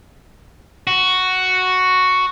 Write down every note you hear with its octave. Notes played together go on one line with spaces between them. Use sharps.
F#4